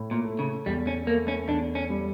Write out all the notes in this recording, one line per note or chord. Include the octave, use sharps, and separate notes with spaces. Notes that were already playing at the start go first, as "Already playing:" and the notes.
Already playing: A2
A#2
A3
C#3
E2 G3
C#4
A3 A#3
C#4
E2 D4
C#4
G3